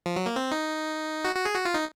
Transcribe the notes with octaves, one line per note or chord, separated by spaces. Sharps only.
F3
F#3
A#3
C4
D#4
F#4
F#4
G#4
F#4
F4
D#4